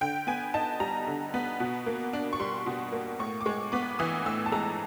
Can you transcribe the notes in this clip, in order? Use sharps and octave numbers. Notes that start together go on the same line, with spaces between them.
D3 G5
B3 G#5
D#4 A5
G3 A#5
D3
B3
B2
A#3
D4
C#6
G3 C6
B2
A#3
A2 C#6
D6
G#3 C#6
B3 D6
E3 D#6
A2 E6
A5
G#3 A#5